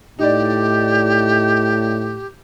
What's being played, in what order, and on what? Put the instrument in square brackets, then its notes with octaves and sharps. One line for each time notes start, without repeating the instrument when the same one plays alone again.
[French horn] A2 [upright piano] D#4 D5 [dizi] G4